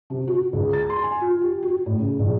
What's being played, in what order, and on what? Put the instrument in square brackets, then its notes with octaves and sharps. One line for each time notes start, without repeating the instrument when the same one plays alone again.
[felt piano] C3
F#4
C#2
A6
C6
G#5
F4
G4
F#4
A2
C#3
A#1